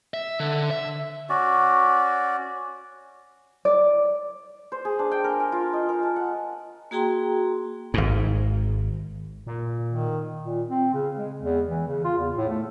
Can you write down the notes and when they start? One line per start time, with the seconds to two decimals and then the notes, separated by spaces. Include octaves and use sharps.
0.14 E5
0.40 D3
0.71 E5
1.29 C#4 F#4 D5
3.65 D5
4.72 C5
4.85 G#4
4.99 D4
5.12 G5
5.24 A#4
5.40 G#5
5.52 F4
5.73 D#5
5.89 A#4
6.03 A5
6.16 F#5
6.91 A#3 F#4 G#4 G5 A#5 C6
7.94 G#1 G#2
9.47 A#2
9.90 D#3
10.43 A#2
10.69 C4
10.94 C#3
11.17 G#3
11.42 E2
11.68 E3
11.88 C#3
12.04 F4
12.18 E2
12.36 A2
12.49 A3